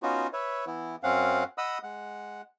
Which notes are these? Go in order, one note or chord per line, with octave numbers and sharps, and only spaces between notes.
B3 C#4 D#4 F4 F#4
B4 C#5 E5
E3 B3 E4
F#2 C4 C#4 F5 F#5
D#5 F#5 B5 D#6 E6
G#3 F#5